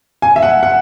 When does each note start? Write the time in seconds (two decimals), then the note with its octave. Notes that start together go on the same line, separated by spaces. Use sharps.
0.22 G#5
0.36 E5
0.43 F#5
0.63 F#5